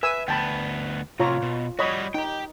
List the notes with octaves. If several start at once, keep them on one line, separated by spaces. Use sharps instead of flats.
B4 E5 G#5 E6
D2 B3 G5 A5 B5
A2 C3 F4 C#5 A#5
B2
G3 F#4 C#5 D#5 B5
D#4 G4 G5